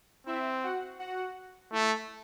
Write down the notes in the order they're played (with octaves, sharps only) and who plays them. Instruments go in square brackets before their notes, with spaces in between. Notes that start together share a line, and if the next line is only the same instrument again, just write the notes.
[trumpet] C4 [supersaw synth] E4 E5
[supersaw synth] F#4 F#5
F#4 F#5
[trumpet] A3 [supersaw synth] E4 E5